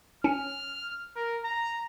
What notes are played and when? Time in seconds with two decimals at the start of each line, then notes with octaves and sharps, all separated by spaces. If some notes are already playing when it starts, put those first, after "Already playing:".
0.24 C#4 F6
1.16 A#4
1.45 A#5